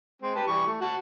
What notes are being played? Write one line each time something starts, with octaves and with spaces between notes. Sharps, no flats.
G#3 C4
G4 B4 A5
E3 G3 C#6
A3
F#4 F#5 A5